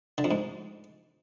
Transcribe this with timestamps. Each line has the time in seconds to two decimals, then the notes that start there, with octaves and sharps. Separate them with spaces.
0.18 D3
0.24 F2
0.31 G#2